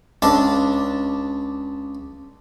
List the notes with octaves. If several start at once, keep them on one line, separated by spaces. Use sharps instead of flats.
C#2 D4 A5